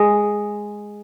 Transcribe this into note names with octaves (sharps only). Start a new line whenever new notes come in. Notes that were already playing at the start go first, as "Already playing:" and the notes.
Already playing: G#3